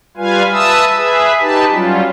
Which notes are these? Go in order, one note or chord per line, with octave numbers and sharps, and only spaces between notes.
G3 F4 B4 F5 G#5
B4 E5 A5 D#6 E6
G#4 B4 E5
D#4 G4 B4 A5
F#3 G3 C#4 F4